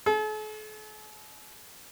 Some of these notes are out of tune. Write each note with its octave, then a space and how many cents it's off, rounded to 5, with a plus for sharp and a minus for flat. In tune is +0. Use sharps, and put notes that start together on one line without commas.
A4 -45